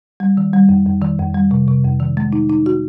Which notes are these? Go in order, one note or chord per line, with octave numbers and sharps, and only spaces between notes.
G3
D#3
G3
F2
F2
D#3
F2
G3
C3
C3
F2
D#3
G#3
D#4
D#4
F#4